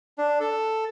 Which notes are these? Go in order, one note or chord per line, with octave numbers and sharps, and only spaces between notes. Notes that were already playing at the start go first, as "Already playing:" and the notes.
D4
A4